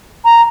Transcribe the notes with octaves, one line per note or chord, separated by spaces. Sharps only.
A#5